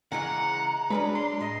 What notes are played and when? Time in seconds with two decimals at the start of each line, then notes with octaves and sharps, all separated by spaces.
0.12 C#3 E3 G#3 F#5 A#5
0.90 F#3 G#3 C#4 D4 B4
1.15 D4 C6
1.40 A2 D#5